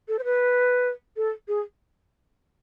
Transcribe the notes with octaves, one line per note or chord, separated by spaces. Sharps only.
A4
C5
B4
A4
G#4